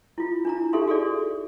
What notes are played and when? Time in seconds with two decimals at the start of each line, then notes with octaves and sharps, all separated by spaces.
0.18 E4 F4
0.45 D4 E4 A#5
0.73 D#4 G4 A4 E5 C6
0.88 F#4 G#4 A4 D5